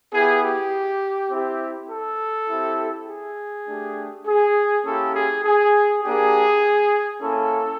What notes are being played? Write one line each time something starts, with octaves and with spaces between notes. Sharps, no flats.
B3 E4 G4 G#4
G4
C4 E4 G4
A4
C4 E4 G4
G#4
A3 D4 G4
G#4
A#3 C#4 E4 G4 A4
G#4
G#4
A#3 D4 G4 G#4
A#3 C#4 E4 A4